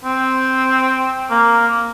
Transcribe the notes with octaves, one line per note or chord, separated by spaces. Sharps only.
C4
A#3